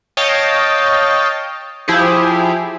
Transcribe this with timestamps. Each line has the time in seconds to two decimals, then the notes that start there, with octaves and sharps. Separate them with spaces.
0.17 C#5 D#5 F5 G5 A5
1.88 F3 E4 G4 G#4